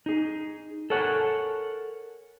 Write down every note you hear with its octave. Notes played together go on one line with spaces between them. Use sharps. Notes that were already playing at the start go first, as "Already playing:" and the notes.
D#4 G#4
A4 A#4 C#5 F#5 G#5